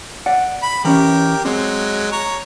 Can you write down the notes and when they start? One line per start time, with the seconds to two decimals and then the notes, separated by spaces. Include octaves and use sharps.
0.26 D5 F#5
0.63 B5
0.85 E3 C#4 G4 A#4
1.45 F#3 G#3 C4
2.12 C#5 A#5